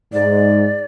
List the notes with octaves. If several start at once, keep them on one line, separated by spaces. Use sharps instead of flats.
G#2 D5